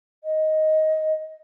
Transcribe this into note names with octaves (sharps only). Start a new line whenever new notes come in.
D#5